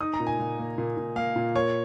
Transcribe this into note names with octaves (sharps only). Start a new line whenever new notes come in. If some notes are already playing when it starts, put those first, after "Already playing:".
D#4 D#6
A#5
A#2
G#5
A#2
A#3
A#2
A#2
A#3 F5
A#2
A#3 C#5